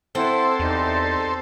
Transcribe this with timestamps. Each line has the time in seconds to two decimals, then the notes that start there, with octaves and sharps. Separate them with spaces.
0.15 C4 E4 A4 C5 F#5
0.59 E2 D#4 G4 D5